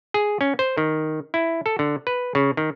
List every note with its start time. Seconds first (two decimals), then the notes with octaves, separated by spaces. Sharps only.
0.14 G#4
0.41 C#4
0.59 C5
0.78 D#3
1.34 E4
1.66 A4
1.79 D3
2.07 B4
2.35 C#3
2.57 D#3